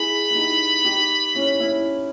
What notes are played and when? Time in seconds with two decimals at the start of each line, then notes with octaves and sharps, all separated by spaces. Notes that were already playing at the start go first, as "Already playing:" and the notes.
Already playing: E4 G#4 B5
0.31 E4
0.35 D#4 G4
0.85 D#4 G4
1.35 C#4 E4
1.60 C#4 E4